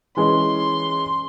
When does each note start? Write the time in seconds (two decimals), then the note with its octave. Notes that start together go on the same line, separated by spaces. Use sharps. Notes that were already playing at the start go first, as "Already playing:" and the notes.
0.17 E3 G#3 C#4 C6